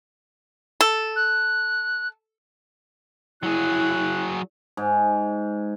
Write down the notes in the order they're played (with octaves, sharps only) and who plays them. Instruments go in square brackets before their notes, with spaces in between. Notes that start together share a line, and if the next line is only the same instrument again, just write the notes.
[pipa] A4
[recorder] F#6
[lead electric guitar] F#3 G#4 [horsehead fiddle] E4 [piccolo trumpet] F#6
[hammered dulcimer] G#2